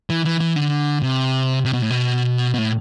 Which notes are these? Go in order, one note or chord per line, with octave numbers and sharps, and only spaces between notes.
E3
E3
E3
D3
C3
C3
B2
A2
B2
B2
A2